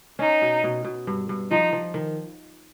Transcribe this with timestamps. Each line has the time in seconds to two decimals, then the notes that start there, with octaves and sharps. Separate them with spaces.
0.19 C#4 D#4
0.42 B2
0.64 B2
0.85 B2
1.07 G2
1.29 G2
1.51 F3 D#4
1.73 F3
1.94 D#3